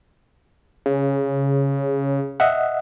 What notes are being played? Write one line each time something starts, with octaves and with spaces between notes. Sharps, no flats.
C#3
D#5 E5 F#5